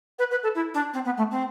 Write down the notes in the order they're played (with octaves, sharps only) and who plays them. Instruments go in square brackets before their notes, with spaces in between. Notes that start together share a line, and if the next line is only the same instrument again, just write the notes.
[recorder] B4
B4
A4
E4
D4
C4
B3
A3
C4